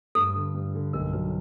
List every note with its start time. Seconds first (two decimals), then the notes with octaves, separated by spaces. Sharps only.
0.15 G2 A4
0.35 D3
0.55 G2
0.75 D3
0.93 B1 A#4
1.13 F#3 B4